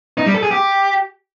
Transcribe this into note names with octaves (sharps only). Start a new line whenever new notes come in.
D#4
G3
A4
G#4
G4